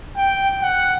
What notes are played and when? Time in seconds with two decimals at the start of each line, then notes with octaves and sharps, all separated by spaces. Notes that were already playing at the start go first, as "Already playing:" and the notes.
0.17 G5
0.62 F#5